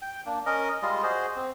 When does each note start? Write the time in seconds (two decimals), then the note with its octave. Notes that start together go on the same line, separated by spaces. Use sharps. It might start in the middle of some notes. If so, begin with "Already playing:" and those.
0.02 G5
0.26 A#3 D4
0.46 C#4 A#4 D#5
0.83 G3 G#3 F4 D#5
1.03 F#4 G#4 C5 D#5
1.36 C4